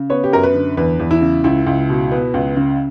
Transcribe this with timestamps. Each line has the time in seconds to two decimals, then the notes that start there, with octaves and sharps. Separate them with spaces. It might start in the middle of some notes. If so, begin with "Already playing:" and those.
Already playing: C#3
0.10 B3 C#5
0.24 G4
0.33 F#2 A#4
0.43 B4
0.54 D3
0.77 E2 B4
0.99 E2
1.11 E4
1.21 C#3
1.44 C#2 E4
1.67 C#2
1.89 B2
2.12 B3
2.34 C#2
2.56 C#3